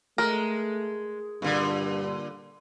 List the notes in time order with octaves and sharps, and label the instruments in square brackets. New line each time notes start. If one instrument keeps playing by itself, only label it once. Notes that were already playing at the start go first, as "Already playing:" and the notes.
[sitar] G#3 [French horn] A3 [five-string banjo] A#4
[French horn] G2 [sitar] A#2 D3